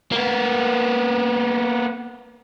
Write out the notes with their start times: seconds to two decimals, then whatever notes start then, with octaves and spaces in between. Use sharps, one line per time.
0.12 A#3 B3